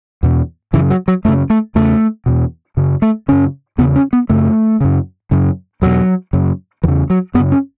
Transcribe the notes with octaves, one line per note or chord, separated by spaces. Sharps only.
E2 B2
F#2 C#3 E3
F#3
F#3
F#2 C#3 A3
A3
E2 C#3 A3
E2 B2
F#2 C#3
A3
F#2 C#3 C#4
E2 C#3 B3
C#4
B3
F#2 C#3 A3
F#2 C#3
F#2 C#3
E2 B2 F#3
F#2 C#3
E2 C#3 E3
F#3
F#2 C#3 B3
C#4